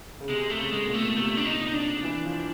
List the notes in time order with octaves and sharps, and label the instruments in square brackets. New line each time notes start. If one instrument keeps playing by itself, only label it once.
[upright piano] C#3
[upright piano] C3 [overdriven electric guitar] G#3
[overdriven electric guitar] A3
[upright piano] C#3
[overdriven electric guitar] G#3
[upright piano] B2
A#2
[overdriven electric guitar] A3
[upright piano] C3 [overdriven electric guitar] A3
[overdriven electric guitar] D4
D#4
D#4
D4
[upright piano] E3
F3